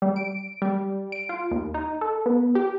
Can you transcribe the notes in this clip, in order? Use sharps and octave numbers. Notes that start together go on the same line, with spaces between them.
G3
D7
G3
D7
F4
D#2
D#4
A4
B3
G4